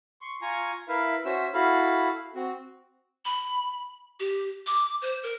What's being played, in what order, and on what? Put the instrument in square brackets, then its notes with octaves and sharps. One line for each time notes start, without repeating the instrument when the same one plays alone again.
[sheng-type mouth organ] C6 C#6
F4 G#5 A#5 C#6
E4 A#4 B4 E5 F5
C#4 F#4 C5 E5 E6
E4 F#4 A4 F5 B5
C4 F#4
[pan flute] B5
G4
D6
C5
A#4